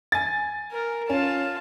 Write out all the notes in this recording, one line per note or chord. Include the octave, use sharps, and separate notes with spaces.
G#5 A6
A#4
C#4 F4 A5